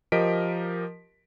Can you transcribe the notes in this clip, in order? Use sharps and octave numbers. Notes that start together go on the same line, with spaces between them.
F3 G4 A#4 D#5 B6 D7